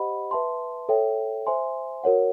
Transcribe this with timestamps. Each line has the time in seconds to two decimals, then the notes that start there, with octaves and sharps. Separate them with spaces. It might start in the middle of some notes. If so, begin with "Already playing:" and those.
Already playing: G4 C5 D#5 F#5 B5
0.31 B4 E5 A5 C6
0.89 A4 C#5 E5 G5
1.47 C5 E5 G#5 C6
2.04 F#4 A#4 C#5 F#5